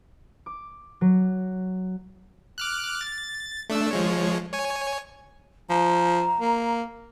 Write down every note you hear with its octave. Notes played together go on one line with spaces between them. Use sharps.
D6
F#3
D6 F6 F#6
A6
A3 D4 E6
F3 G#3 C#5
C#5 G#5
F3 A#5
A#3